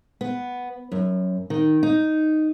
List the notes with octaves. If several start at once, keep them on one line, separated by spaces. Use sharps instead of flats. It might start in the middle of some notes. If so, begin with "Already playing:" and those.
B3
F#2
D#3
D#4